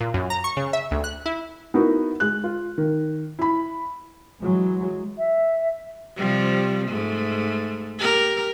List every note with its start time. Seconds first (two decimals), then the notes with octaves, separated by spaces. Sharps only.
0.01 A#2
0.14 F#2
0.30 A#5
0.44 C#6
0.57 C#3
0.73 E5
0.91 D2
1.04 F#6
1.26 E4
1.74 B3 D#4 E4 F#4 A#4
2.20 G#3 F#6
2.44 F4
2.78 D#3
3.39 E4 B5
4.41 E3 F#3 G#3
5.18 E5
6.17 C3 F3 G3
6.88 G#2 A3
7.99 G4 A#4